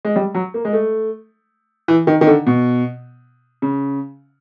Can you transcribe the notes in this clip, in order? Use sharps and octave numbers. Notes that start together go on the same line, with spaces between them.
G#3
G3
F#3
A#3
G#3
A3
E3
D#3
D#3
D3
B2
C#3